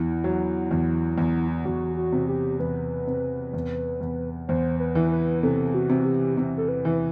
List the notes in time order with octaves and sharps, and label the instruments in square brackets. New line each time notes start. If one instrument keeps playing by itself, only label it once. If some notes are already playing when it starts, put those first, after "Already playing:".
Already playing: [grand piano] E2 [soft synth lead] E4
[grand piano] F#3
E2
E2
[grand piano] E2 [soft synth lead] F#4
[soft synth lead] F#4
[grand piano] C3
[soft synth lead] G4
[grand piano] E2 [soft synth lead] B4
[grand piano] C3
E2
E2
[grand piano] E2 [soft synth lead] C5
[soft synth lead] B4
[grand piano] E3
[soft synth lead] B4
[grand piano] C3 [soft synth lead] A4
[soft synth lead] F#4
[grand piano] C3
[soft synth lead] G4
[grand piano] C3
[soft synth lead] A4
B4
[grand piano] E3